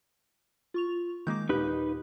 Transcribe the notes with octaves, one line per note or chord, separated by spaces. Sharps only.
F4 C#6 F7
D#3 G#3 A#3 D6 G6
D#2 A#2 D#4 G4 B4